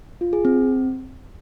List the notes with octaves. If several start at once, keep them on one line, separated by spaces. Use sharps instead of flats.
F4
G#4
C4